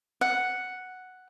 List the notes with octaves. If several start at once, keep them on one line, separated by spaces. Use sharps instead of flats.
F#5